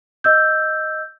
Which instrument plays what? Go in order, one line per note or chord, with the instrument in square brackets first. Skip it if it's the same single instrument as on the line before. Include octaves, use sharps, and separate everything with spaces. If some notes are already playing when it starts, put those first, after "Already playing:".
[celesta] D#5 E6 G6